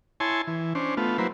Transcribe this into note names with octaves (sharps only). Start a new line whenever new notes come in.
E4 C#5 G#5 A5 C6
E3
C#4 D4 C5
A3 B3 F4
F#3 A#3 E4 B4 C5